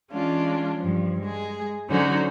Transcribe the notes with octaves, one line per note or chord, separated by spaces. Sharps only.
E3 G#3 C#4 D4 F4
G2 F3
G#3 G#4
D3 F#3 C#4 D#4 F#4 C5